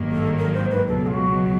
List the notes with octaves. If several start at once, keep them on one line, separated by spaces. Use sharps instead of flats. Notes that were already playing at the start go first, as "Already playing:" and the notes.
Already playing: G#1 G2 D#3 F#3 A#3
A4
A#4
C5
B4
C#2 B2 F#3 A4
F4
F#4